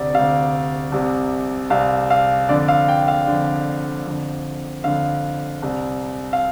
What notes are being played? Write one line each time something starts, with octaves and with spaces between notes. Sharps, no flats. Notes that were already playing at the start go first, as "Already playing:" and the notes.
Already playing: D2 C3 D5
D2 C3 F5
C2 C3
C2 C3 F5
F5
F2 D3 D5
F5
G5
F5
F2 D3
F2 D3
F2 D3 F5
C2 C3
F5